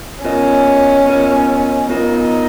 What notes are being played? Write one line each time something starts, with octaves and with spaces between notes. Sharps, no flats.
B3 C#4 F4 A#4 D#5
B3 F4 A#4 D#5
B3 D#4 F4 A#4 D#5